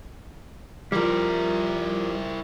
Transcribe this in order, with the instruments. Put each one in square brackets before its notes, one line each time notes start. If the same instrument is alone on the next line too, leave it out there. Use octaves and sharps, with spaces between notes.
[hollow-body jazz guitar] F3 G3 [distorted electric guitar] E4 A#4